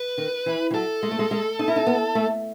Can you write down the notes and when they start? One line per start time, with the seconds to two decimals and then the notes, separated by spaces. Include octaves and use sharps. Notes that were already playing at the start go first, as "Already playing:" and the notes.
Already playing: B4
0.18 D#3
0.46 E3
0.71 E3
0.74 F#3 A4
1.03 G#3
1.11 A3
1.19 G#3
1.31 G#3
1.59 D#4
1.68 E4
1.76 D#4
1.87 B3
2.15 A3